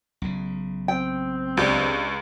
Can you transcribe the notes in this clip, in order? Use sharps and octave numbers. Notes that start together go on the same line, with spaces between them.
B1 C#3
C4 G5
C#2 D4 G4